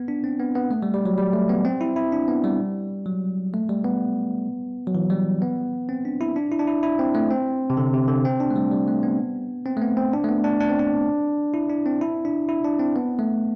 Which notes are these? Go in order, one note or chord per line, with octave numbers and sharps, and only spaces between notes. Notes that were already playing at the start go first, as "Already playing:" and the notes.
Already playing: B3
D4
C4
B3
B3
A3
G3
G3
F#3
G3
A3
B3
C4
E4
E4
D4
B3
G3
F#3
A3
G3
B3
F#3
E3
G3
B3
C4
D4
E4
D4
E4
D4
E4
E4
C4
A3
C4
C3
D3
C3
D3
C4
D4
A3
G3
G3
A3
B3
C4
A3
B3
C4
D4
A3
B3
D4
D4
C4
D4
E4
D4
C4
E4
D4
E4
D4
C4
B3
A3